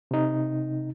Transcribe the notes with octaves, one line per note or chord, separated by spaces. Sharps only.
C3 D#4